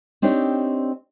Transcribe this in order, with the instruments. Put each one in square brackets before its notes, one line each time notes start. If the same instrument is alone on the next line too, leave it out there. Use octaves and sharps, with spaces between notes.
[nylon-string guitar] C4 D4 D#4 G4 C#5